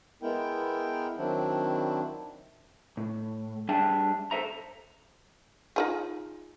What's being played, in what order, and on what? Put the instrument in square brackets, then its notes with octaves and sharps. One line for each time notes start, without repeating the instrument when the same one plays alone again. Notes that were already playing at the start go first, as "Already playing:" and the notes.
[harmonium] G#3 B3 E4 A#4 G5
D#3 F#3 C4 D4 E4
[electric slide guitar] A2
G3 D4 G#4 E5 G5 A5
A4 C5 E5 A#5
[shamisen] D#4 F4 G#4